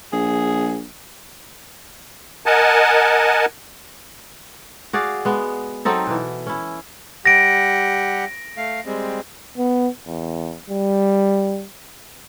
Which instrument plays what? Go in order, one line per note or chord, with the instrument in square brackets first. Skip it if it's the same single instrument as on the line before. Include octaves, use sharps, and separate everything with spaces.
[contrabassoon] A#1 [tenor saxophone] G#4
[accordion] A#4 D#5 F#5 G#5 A5
[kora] F#4 G#4 D5 F5
G#3 B3
F#3 C4 D#4 A4
B2 E3
C#4 E4
[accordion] G3 G4 F#5 [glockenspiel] A#6 D7
[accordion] A3 F5
G3 G#3 C4
[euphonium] B3
E2
G3